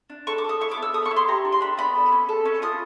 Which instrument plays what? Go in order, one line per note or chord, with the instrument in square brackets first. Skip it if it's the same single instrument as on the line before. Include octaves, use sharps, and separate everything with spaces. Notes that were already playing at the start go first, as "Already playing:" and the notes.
[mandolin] D4
A4 C#6
D6
A4 D#6
E4 C#6
D6
B3 E6
A4 D#6
C#6
E4
C6
G4 A#5
D4
C6
D4 B5
B3 B5
A4
C#4
A4
C#4
F4 D#6